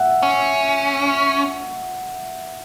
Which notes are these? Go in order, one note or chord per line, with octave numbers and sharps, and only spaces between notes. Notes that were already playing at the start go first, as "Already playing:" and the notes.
Already playing: E5 F#5
C#4